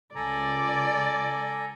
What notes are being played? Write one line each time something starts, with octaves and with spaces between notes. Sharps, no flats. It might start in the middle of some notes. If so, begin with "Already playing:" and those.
C#2 A4 D5 G#5 A#5